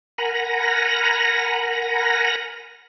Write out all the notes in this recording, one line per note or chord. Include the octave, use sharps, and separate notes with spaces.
A#4 F#5 G#5 A#5 B5 A#6